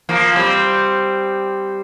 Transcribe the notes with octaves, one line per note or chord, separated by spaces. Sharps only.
F3 A#3
G3 C4